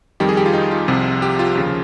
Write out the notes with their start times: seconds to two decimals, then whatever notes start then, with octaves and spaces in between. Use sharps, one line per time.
0.20 F2 D#3 G3 G4
0.29 G#4
0.37 G4
0.46 F4
0.53 D#4
0.71 F4
0.88 C2 C3 F3
1.22 G4
1.39 F4
1.55 D#2 C#3 F3